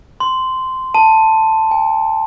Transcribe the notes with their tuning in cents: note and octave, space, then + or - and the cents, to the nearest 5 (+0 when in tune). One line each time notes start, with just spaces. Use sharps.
C6 -15
A5 +5
G#5 -45